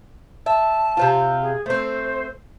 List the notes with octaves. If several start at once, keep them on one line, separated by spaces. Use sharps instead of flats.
E5 A5
C3 C4 F4
G#4
A3 C4 C5